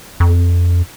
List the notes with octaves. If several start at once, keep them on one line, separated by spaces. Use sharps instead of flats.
F2